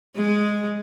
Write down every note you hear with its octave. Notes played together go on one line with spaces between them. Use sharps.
G#3